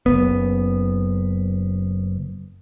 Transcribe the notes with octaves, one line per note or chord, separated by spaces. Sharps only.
F#1 F2 B3